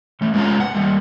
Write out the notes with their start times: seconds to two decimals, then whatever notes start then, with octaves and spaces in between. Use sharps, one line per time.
0.21 E3 A3
0.34 G#3 B3 C#4 F4 A#5
0.60 F#5
0.75 G3 A#3